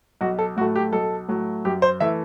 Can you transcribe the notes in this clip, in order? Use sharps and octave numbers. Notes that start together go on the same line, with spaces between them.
B1 F#4
A4
A2 F#3 A3 F#4
G4
B1 A4
A2 F#3 A3
F#2 G4
C5
E3 A3 E5